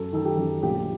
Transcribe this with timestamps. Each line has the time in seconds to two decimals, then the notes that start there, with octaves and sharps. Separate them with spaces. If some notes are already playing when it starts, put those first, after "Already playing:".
Already playing: F#2 A4
0.13 D#3 A4
0.25 G4
0.37 F#2
0.63 A#1 G4